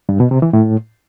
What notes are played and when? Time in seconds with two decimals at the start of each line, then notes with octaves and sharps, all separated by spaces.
0.09 G2
0.20 B2
0.31 C3
0.42 E3
0.53 A2